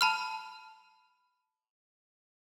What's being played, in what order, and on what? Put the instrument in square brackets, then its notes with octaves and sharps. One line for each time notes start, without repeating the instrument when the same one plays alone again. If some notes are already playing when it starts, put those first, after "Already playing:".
[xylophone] A5 B5 F6